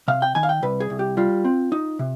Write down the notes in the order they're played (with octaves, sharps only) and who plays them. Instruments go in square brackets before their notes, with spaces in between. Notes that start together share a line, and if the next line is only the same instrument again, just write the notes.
[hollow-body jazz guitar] C3 F5
G5
D#3 G#5
F5
G5
C2 B4
G#4
C2
G4
G3 F4
C4
D#4
C3